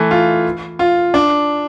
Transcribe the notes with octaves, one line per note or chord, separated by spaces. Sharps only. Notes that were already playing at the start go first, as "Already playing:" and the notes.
Already playing: E3 A3
F4
F4
D4